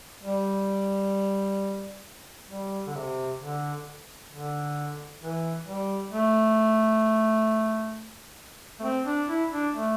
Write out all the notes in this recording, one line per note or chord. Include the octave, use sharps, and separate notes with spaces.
G3
G3
D3
C3
D3
D3
E3
G3
A3
A3
C4
D4
E4
D4
A3